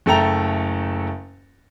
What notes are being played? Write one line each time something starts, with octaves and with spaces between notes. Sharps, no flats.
F#1 A3 A4 G5 A#5 F7